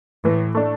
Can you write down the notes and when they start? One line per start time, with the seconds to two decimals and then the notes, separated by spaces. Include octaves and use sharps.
0.25 A2 E3
0.55 A3 D4